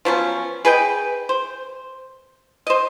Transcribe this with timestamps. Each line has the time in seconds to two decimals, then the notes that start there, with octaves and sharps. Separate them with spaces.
0.05 F3 F#3 B3 C#4
0.65 G#4 B4 D#5 G5
1.29 C5
2.67 C5 D#5